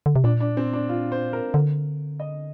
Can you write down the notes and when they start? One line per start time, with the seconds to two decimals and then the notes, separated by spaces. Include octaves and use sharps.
0.06 D3
0.16 C3
0.24 A#2 D4
0.40 D4
0.57 C4
0.73 D4
0.89 F4
1.12 C5
1.33 A#4
1.54 D3
2.20 D#5